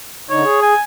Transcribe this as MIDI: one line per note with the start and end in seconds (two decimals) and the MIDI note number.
0.30 0.43 50
0.30 0.43 63
0.30 0.62 73
0.44 0.74 68
0.62 0.82 80